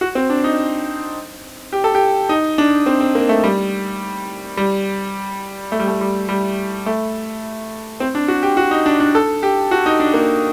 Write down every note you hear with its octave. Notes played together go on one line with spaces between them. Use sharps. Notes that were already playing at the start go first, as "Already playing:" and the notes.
F#4
C4
D4
D#4
G4
A4
G4
D#4
D4
C4
C4
A#3
A3
G3
G3
A3
G3
A3
G3
G3
A3
C4
D4
F#4
G4
F#4
D#4
D4
D4
A4
G4
F#4
D#4
D4
A#3